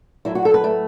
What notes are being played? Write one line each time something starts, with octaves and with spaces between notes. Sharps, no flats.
A2 F#3 E4
F#4
A4
B4
A3